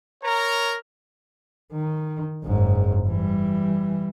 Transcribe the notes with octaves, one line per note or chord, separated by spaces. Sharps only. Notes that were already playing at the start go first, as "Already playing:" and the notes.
A#4 C#5 A#5
D#3
F#1 G#2
E3 G3